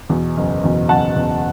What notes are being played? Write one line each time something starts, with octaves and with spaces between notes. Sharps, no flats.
E2 B2
F#1
E2 B2
F#1 F#5 A5
E2 B2